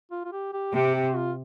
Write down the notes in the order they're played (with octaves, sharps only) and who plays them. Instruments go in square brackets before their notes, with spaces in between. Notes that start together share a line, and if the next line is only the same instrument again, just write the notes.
[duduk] F4
F4
G4
G4
[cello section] C3 [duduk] G4
[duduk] G4
F4